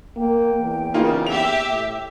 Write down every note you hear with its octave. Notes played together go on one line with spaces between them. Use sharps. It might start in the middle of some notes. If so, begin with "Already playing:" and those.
A#3 G5
E2
C#3 A#3 D#4 F4
G4 E5 F7
A2